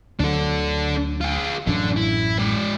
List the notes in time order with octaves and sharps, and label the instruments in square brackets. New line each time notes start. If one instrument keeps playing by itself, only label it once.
[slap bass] D2 F#3 [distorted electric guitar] D4 A4
[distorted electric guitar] F4 G#4
[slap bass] A1 F#2 A2 [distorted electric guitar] D3
[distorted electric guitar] E4
G#3 D5